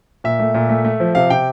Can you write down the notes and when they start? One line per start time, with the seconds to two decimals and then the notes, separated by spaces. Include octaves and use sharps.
0.24 A#2 E5
0.40 A3
0.54 A#2
0.69 A3
0.85 A3
1.00 F3
1.15 C3 F5
1.30 C3 G5